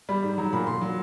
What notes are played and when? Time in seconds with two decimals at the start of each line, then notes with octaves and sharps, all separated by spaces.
0.09 G3 B5
0.23 G#2
0.38 F#3 A#5
0.53 A#2 B5
0.67 A#2 C6
0.82 F#3